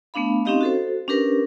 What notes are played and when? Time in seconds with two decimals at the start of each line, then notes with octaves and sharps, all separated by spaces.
0.14 A3 B3 D4 F5 B5
0.45 C4 C#4 D#4 G4 D#5 F5
0.61 F#4 A4 C5
1.08 C#4 D4 G4 A#4 B4